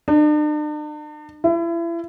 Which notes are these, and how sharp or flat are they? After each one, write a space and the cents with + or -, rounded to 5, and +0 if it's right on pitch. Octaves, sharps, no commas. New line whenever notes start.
D4 +45
E4 +35